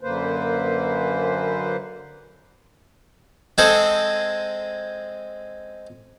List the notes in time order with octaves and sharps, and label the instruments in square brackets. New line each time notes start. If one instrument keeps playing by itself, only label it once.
[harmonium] F#2 D3 A#3 B4 C5
[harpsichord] G#3 C4 G#4 A4 C5